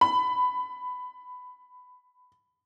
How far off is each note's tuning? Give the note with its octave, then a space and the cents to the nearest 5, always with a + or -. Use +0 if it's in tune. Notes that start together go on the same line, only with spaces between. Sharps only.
B5 +15